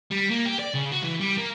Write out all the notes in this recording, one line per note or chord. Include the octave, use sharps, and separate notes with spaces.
G3
A#3
G4
D5
C#3
F#4
E3
G3
A#3